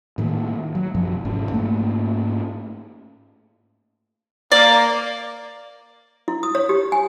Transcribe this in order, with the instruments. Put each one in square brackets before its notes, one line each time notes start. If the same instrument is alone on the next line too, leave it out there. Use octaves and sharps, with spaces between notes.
[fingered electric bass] A2 D#3 A#3
F#3
F#2 C3 F3 F#3
G#1 G#2 C#4
G#2 A3 A#3 C#4
[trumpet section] A#3 [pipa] D5
[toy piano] E4
D#6
C#5
G4
G#5